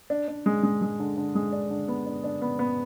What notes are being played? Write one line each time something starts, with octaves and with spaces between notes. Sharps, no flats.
D4
D4
G#3
G#3
G#3
D3
D3
G#3
D4
D3
B3
D4
D4
B3
B3